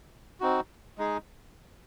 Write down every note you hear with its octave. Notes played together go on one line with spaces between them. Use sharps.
C4 D#4 F#4
G#3 D#4 G#4